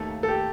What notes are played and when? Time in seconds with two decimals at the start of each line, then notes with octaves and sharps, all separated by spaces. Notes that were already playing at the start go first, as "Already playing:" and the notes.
Already playing: D#2 D#3 A3 A#3 A4
0.23 A4
0.28 G4